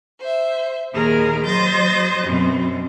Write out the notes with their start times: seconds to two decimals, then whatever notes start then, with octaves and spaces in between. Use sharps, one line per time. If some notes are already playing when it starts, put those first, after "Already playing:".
0.19 C5 E5
0.93 D#2 A#2 D#3 G#4 A#4
1.43 F#3 C5 D#5 G6 A6 A#6
2.24 F#2 B2 C4